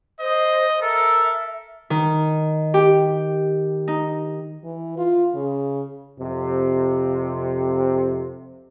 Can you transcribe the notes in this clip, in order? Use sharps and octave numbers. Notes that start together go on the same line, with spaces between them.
C5 D#5
A4 A#4 E5
D#3
G4
D#4
E3
F4
C#3
F2 C3